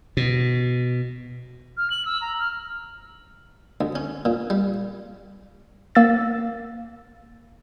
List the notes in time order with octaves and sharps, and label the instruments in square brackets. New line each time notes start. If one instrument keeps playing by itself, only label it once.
[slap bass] B2
[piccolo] F6
F#7
E6
A#5
F6
[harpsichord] D2
C#4
A#2
G3
[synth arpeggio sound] A#3 E6 A6